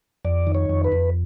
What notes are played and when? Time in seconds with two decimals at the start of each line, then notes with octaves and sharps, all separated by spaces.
0.25 F2 D5
0.47 D#3
0.55 C#5
0.70 F2
0.84 B4
0.92 F2